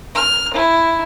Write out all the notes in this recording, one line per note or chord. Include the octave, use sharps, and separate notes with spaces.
F6
E4